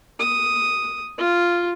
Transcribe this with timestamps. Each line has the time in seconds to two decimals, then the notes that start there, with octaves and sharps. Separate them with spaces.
0.19 D#6
1.18 F4